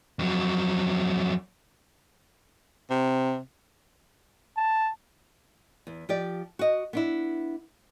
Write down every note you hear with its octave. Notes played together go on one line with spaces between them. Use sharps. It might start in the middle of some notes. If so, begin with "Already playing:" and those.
F2 F#3
C3
A5
E2
F3 G4 D5
F#4 D#5
B3 D4 E4